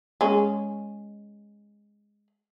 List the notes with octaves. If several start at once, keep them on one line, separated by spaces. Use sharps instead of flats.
G#3 C#4